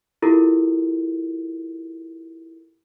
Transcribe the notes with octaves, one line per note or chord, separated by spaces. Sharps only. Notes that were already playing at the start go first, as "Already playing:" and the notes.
E4 F4 G4 A4 A#4